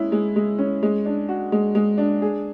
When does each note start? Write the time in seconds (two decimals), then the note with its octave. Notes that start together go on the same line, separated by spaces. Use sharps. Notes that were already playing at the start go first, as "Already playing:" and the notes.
Already playing: G#3 C#4 E4
0.12 G#3
0.36 G#3
0.58 C#4
0.83 G#3
1.06 D4
1.29 F#4
1.52 G#3
1.75 G#3
1.98 D4
2.22 G#4